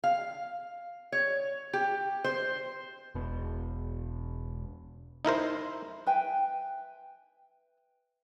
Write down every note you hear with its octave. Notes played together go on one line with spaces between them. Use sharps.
F5
C#5
G4
C5
E1 B2
D#4 E4 A#4 C5
B4 E5 G5 G#5